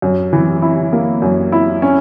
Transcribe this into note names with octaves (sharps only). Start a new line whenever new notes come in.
F#2
E3
E4
A#3
F#2
E4
C#4